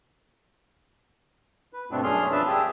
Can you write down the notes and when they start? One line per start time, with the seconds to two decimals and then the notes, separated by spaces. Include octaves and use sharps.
1.73 B4
1.91 G2 B2 A3 B3 C4 D4
2.04 F#2 C#4 D4 G#4 C6 F6
2.32 F3 D4 B4 E5 A5 E6
2.47 G4 G#4 E6